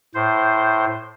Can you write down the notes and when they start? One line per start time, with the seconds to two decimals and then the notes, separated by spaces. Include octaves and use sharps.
0.15 A2 C5